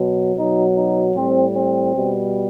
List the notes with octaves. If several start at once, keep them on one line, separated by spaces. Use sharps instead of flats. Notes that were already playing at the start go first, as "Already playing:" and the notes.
Already playing: B2 F#3
B2 F#3 D#4
D#4
A2 G3 C4
C4
B2 G3